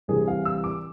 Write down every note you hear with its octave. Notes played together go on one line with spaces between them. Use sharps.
C2 C3 E3 G#4
F5
E6
D6